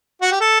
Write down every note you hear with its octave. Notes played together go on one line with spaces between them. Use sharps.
F#4
G4
A4